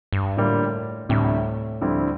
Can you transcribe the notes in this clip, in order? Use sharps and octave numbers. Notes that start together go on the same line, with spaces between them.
G2
A2 D3 G3 A#3 F4
D2 A2 C3 G3
D2 D3 F3 G3 C4 E4